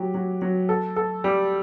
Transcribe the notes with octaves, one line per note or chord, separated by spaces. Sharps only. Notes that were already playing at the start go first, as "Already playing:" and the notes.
Already playing: F#3 G4
F#3
F#3
A4
A4
G3